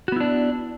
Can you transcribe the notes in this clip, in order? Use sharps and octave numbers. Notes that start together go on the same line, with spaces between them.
B3 D4 E4 F#4